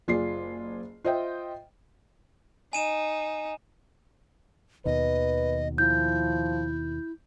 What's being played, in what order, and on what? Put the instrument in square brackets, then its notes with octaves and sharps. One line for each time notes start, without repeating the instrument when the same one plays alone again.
[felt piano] F#1 F4 G#4 D5 C7
F4 C5 D#5 E5 G5
[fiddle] D#4 [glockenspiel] G#5 D#7 E7
[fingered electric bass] D#2 B2 D#3 [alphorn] B4 [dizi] D#5
[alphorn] F3 [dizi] E4 [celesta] G6